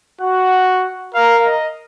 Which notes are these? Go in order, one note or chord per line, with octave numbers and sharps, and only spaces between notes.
F#4 F#5
A#4 F5
D#5